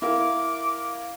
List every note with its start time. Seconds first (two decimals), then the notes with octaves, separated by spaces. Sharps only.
0.02 E4 A#4 F5 D6